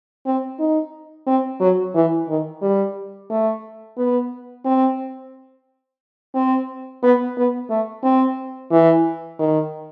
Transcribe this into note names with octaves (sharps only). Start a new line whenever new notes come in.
C4
D#4
C4
F#3
E3
D#3
G3
A3
B3
C4
C4
B3
B3
A3
C4
E3
D#3